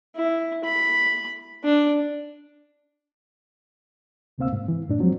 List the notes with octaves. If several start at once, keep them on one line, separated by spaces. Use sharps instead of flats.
E4
B5
D4
D2 C3 A#3 C4 F5 E6
G#2
E3
F#2 A2 D4
F3 F#3 G#3 C4